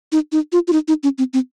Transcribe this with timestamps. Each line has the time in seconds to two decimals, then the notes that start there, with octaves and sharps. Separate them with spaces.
0.12 D#4
0.32 D#4
0.52 F4
0.68 F4
0.72 D#4
0.88 D#4
1.03 C#4
1.18 C4
1.33 C4